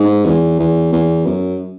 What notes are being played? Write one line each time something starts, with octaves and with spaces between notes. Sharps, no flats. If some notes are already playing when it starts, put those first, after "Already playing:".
Already playing: G#2
E2
E2
E2
F#2